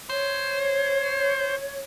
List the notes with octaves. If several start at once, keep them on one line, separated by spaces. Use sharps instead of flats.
C5 C#5